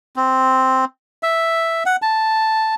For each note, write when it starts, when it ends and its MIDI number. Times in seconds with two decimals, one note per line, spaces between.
0.16 0.85 60
1.23 1.83 76
1.86 1.96 78
2.02 2.75 81